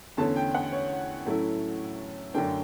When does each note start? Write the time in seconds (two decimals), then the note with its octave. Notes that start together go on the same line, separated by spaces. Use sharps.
0.17 E2 D3 A3 C#4 A5
0.36 G5
0.55 F#5
0.72 C#5
1.26 A2 F#3 A3 C#4 E4
2.34 F#2 D3 A3 D4 G5